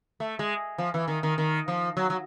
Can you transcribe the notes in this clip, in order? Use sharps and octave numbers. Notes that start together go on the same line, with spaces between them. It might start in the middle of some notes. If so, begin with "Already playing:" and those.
A3
G#3
F3
E3
D#3
D#3
D#3
F3
F#3
F#3